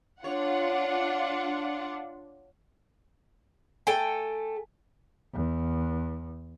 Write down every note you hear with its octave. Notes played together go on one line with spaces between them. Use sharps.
D4 F4 C#5 F#5
A3 A4 G5 G#5
E2